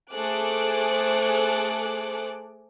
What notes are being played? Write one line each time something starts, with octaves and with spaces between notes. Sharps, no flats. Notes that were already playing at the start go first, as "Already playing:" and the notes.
A3 G#4 A4 C5 D6 F#6